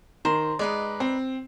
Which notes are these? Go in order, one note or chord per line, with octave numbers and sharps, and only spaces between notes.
D#3 C5 A#5 C6
G#3 D#4 B4 D5
C4